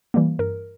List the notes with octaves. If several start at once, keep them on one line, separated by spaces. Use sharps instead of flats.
E3 G3 A#3
G2 A#4